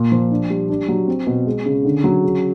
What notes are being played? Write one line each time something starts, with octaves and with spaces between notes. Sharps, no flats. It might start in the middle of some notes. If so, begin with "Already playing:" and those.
Already playing: A#2
F3
D4
G3
D4
F#3
C4
B2
G#3
C#3
D3
F#3
C#3